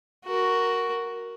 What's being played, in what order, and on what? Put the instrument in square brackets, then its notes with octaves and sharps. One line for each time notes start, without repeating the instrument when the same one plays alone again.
[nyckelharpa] F#4 A#4